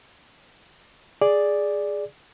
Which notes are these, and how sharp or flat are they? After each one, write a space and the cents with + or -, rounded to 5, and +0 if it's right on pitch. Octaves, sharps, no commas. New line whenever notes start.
G#4 +0 D5 +0